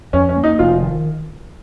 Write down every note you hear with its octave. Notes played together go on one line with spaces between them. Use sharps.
F2 C#4
C#4
A#3
D#4
F1 F4
D#3